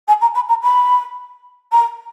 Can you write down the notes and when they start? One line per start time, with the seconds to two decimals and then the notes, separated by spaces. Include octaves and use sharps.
0.08 G#5
0.21 A#5
0.35 B5
0.49 A#5
0.62 B5
1.72 A#5